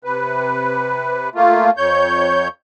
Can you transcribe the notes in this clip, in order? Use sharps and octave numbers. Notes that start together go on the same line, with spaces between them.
C3 B4
A3 A#3 F4
F2 C#5 G6